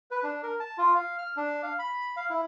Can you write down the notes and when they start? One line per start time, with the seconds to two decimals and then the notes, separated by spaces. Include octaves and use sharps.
0.11 B4
0.23 D4
0.43 A#4
0.60 A5
0.78 F4
0.95 F5
1.18 F6
1.37 D4
1.63 F5
1.79 B5
2.16 F5
2.30 E4